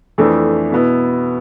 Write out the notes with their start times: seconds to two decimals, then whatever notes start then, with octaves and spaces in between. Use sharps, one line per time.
0.18 F2 E3 A3 D4
0.71 B2 B3 E4